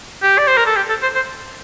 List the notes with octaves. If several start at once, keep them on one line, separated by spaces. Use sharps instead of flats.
G4
D5
C5
A#4
A4
G4
A4
C5
C5